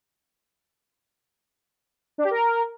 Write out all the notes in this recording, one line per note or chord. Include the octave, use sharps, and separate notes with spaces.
D4
G4
A#4